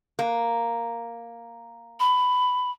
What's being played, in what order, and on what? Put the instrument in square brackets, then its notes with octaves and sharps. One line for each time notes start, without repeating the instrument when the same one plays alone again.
[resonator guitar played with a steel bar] A#3
[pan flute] B5